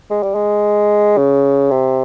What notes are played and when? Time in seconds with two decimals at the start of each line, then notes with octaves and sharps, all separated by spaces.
0.11 G#3
0.23 G3
0.35 G#3
1.18 C#3
1.71 C3